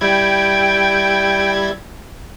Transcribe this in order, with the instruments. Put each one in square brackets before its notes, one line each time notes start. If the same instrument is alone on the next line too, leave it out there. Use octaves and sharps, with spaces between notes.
[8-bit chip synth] G3 E4 G#6 [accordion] G5